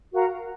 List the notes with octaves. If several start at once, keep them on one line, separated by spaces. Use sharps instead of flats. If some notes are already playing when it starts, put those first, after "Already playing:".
F#4 A#4 F5 A#5